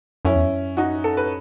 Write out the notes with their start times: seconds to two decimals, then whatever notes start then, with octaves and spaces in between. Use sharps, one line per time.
0.25 F#2 C#4 E4
0.35 E2
0.44 F#2
0.77 D#4 F#4
1.04 A4
1.17 B4